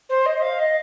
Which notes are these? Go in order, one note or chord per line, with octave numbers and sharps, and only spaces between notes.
C5
D#5
D#5
F5
D#5